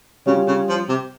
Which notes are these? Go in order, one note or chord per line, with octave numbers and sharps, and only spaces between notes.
C#3 G3 C#4 F4
C#3
F3
C3